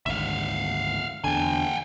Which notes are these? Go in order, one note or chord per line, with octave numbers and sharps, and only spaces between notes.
G#1 D2 E5 F5
E2 D3 G5 G#5